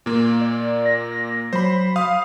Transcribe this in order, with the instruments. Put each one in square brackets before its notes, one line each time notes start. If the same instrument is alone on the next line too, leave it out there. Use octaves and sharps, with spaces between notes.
[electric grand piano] A#2 A#3
[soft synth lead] D5
A#6
[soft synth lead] F#3 [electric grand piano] C5 B5
[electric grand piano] F5 D#6